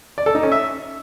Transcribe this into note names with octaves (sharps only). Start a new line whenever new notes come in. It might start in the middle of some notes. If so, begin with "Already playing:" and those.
D5
A4
D#4
C#4
E5